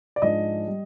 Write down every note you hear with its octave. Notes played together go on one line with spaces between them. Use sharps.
D5
G#2 F3 G#3 D4 D#5
G3